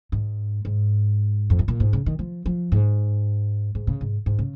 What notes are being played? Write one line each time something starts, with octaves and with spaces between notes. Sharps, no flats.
G#2
G#2
F2
G#2
A#2
G#2
C#3
D#3
F3
F3
G#2
G#2
C#3
G#2
G#2
C#3